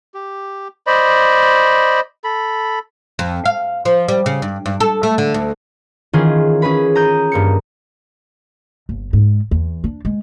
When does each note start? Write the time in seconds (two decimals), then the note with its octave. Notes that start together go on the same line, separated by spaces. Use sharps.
0.14 G4
0.87 C5 D5 D#5 B5
2.24 A4 B5
3.19 F2
3.45 F5
3.85 F3
4.08 G3
4.26 C#3
4.42 G2
4.66 G2
4.80 A4
5.03 A3
5.18 D3
5.34 D2
6.13 D#3 E3 C#4 F4 G#4
6.62 C#4 G#4 B4 B5
6.95 A#5 D#6 G6
7.32 G2 A#3 C#7
8.89 G1
9.13 G#2
9.51 E2
9.84 D4
10.05 G#3